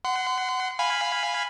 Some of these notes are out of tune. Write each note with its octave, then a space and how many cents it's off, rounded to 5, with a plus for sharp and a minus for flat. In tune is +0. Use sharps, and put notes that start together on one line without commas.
F#5 +10 C6 -30
F5 +0 G#5 -10 B5 +0